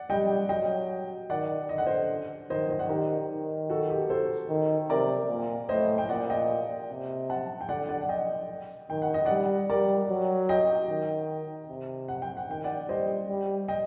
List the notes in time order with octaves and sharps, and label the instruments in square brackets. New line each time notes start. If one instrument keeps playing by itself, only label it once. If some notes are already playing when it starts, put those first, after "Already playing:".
Already playing: [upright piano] D5 F#5
[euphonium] G3 [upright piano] D#5 G5
[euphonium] F#3 [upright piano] D#5 G5
[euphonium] D#3 [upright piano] D5 F#5
[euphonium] D3 [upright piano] D#5
[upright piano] F#5
C5 D#5
[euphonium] D#3 [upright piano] C5 D#5
[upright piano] C5 D#5
D5 F#5
[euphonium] D#3 [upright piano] G4 A#4
[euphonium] D#3
[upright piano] F#4 A4
G4
A4 C5
[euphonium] D#3
[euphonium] C3 [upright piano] A#4 D5
[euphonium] A#2
[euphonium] A2 [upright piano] C5 D#5
[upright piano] G5
[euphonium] A#2 [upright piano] D5 F#5
[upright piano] D#5 G5
[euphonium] C3
[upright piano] F#5 A5
G5
[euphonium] D3 [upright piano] D5 F#5
[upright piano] D5 F#5
F#5
D#5 G5
[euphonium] D#3 [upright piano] G5
[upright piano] F#5
D#5
[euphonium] G3 [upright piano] D5 F#5
[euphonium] G3 [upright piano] A#4 D5
[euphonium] F#3
[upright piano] D#5 G5
[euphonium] D#3
C3
[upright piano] F#5
G5
F#5
[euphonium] D#3 [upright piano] G5
[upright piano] D5 F#5
[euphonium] G3 [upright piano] C5 D#5
[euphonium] G3
[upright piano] D#5 G5